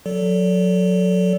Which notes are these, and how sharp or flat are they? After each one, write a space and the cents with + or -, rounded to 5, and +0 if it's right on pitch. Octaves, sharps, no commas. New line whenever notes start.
F#3 -30 A4 +0 D5 -30